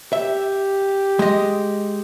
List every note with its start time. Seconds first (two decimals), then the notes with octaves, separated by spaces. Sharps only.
0.13 G4 E5
1.19 G#3 D#5